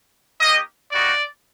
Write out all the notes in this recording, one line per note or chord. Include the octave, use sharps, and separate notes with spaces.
A#3 D#4 G4 D#5
G3 A#3 D#4 F#4 D5